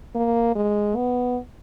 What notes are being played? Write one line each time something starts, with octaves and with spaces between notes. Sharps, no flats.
A#3
G#3
B3